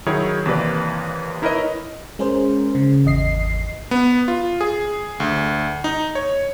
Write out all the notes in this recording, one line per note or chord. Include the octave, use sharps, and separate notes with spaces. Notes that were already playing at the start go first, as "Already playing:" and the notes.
D#3 F#3 E4 G#4 C#5
D#2 C3 E3 A#3 B4 D5
D#4 E4 A#4 B4 C#5 D#5
G#3 C#4 G#4 A#4 C5
C#3
G#1 E2 D#5 C7
B3
F4
G#4
D2
D#4
C#5